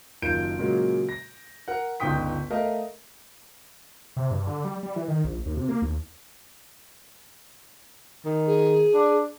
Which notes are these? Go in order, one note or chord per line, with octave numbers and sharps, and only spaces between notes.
F#1 D#3 F4 G6 D7
A#2 C#3 F#3 G#3 A#3
A#6
A#4 F#5
G1 C#2 D#4 G5 D#6 B6
A3 A#4 D#5 F5
C3
G2
D3
G3
G3
E3
D#3
A#1
D#2
C3
A#3
D#2
D#3
G#4
D4